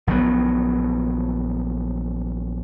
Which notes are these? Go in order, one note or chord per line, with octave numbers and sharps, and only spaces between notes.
A#1 D#3 F#3 B3